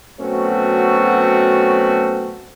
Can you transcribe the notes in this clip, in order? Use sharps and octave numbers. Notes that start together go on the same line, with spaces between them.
B2 F#3 A3 C4 C#4 F#4